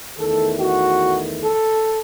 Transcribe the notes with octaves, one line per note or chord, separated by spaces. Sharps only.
E2 D#3 A3 A4
F#4
A4